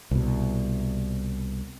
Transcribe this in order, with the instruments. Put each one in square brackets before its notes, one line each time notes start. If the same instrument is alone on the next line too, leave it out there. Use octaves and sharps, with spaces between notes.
[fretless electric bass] C2 B2